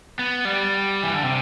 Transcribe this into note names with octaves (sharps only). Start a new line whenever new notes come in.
B3
G3
E3
D3
C3